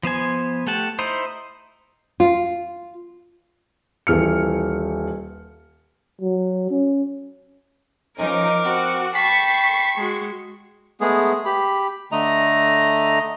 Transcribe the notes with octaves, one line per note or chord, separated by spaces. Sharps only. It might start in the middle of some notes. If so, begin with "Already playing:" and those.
F3 B3 C5 G#5
A3 G4 F#5 A5
D#4 E4 C5
F4
D#1 E3 F6 C#7
F#3
C#4
F3 C#4 D#4 A#4 D6
C4 F#4
G5 A5 B5 C#6 B6 C7
G#3 F#4
G#3 A3 B3 G#4
G4 B5
D3 A3 D#5 A#5